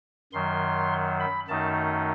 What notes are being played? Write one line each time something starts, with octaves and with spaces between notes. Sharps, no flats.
F#2 D#3 F#3 C6
B5
F#2 D#3 A3 D#4 A5